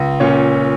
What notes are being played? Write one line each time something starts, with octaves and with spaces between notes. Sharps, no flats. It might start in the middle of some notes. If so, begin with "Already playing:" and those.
Already playing: C#2
A#2 C#4 C#5